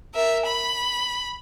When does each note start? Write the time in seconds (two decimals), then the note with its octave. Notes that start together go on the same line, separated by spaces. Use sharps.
0.14 A#4 E5
0.46 B5